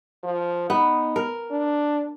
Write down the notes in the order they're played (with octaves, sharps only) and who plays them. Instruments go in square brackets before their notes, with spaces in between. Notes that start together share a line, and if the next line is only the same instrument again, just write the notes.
[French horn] F3
[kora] B3 [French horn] D#4
[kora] A#4
[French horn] D4